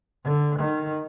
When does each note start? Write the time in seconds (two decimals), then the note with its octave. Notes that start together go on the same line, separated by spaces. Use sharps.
0.24 D3
0.59 D#3